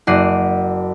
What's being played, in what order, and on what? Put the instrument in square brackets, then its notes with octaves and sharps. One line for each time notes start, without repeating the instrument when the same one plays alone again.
[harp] F#1 F#4 D5 C7 D#7